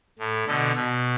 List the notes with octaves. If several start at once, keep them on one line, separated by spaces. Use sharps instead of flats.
A2
B2 D3
B2